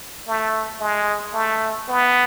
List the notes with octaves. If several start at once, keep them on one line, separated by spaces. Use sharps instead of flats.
A3
G#3
A3
B3